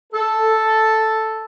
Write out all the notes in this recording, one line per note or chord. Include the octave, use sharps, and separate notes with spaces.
A4